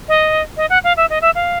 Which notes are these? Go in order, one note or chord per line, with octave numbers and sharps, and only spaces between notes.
D#5
D#5
F#5
F5
E5
D#5
E5
F5